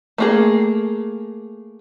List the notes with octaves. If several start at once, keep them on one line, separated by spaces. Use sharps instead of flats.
A3 A#3 G#4